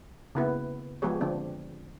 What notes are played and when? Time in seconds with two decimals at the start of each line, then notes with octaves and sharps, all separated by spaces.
0.35 C#3 A#3 B3 E4 B4
1.02 F3 G#3 B3 G4 G#4 C#5
1.21 D3 F3 C4 D4